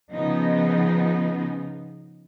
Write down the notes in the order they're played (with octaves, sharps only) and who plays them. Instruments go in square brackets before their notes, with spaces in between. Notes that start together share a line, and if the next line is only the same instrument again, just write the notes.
[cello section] C#3 F3 B3 D#4